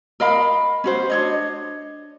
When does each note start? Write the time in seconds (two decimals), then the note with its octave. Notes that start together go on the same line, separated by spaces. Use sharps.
0.20 A#4 D#5 F5 B5
0.84 C#4 F#4 C5
1.10 D4 C#5 D#5